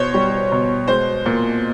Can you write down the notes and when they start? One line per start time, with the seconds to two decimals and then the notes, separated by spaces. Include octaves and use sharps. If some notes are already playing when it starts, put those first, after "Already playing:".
Already playing: B2 C5 C#5
0.14 G3
0.52 B2
0.88 G#3 C5
1.26 A#2